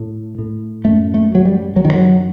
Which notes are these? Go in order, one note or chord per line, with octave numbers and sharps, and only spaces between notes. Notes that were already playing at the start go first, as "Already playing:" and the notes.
Already playing: A2
A2
F#2 A3
A3
F#2 F#3
G3
F#2 F#3
D#3
F#3